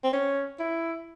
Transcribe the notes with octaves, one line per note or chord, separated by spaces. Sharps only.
C4
C#4
E4